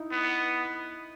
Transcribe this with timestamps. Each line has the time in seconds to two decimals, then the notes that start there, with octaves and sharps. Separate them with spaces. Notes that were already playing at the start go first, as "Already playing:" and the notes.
Already playing: D#4 E4
0.12 B3